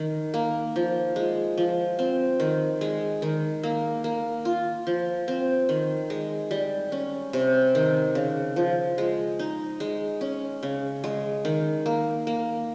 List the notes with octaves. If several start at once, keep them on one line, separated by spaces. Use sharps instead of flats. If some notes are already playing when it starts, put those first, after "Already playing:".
Already playing: D#3
A#3
F3
G#3
F3
C4
D#3
G#3
D#3
A#3
A#3
F4
F3
C4
D#3
G#3
G3
C#4
C3
D#3
C#3
F3
G#3
D#4
G#3
C#4
C#3
G#3
D#3
A#3
A#3